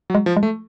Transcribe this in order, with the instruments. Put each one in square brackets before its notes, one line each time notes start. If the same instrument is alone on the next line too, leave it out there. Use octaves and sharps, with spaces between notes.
[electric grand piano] F#3
[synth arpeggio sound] G#3
[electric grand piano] F3
[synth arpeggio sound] G#3
[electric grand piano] A3